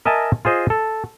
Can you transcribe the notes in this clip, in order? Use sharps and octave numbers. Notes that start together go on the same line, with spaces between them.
A#4 D#5 E5 G#5 A5
F4 G#4 C5 D#5
A4